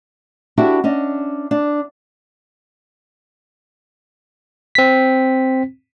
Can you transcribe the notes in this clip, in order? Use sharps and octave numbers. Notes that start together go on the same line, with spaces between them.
D4 E4 F#4 G4 A4 E5
C#4 D4 D#5
D4
C4 B6